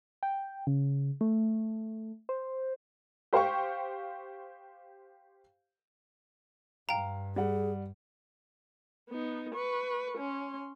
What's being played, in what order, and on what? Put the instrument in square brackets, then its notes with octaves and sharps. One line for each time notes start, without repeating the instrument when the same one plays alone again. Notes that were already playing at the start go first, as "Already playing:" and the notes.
[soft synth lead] G5
C#3
A3
C5
[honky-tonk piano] G4 C5 F5 G5 C#6
[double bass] G2 [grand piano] F5 [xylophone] G5 A#5
[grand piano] G3 F#5 [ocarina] G#4
[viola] B3 D#4
B4 C#6
C#4 C6